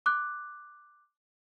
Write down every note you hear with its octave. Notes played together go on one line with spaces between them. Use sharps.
D6 F#6